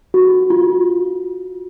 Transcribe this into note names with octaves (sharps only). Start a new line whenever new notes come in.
F#4
F4